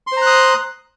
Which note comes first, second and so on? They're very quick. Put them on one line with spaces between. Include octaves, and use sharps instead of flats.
C6 C5 A#5 F#6 D#6